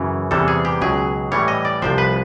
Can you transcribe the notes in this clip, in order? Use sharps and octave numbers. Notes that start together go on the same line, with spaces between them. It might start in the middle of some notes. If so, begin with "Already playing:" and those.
Already playing: F#2 C#3 E3
E2 C3 E3 G3 A4
G#4
G4
C#2 B2 F#3 G#4
A2 E3 G3 C#5
D#5
D5
C2 C3 F3 C5
B4